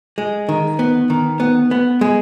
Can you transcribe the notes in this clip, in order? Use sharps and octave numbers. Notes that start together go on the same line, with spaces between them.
G#3
D#3
B3
D#3
B3
B3
G#3